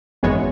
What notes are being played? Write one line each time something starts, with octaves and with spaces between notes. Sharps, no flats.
G#1 F#2 E3 G#3 B3 C#5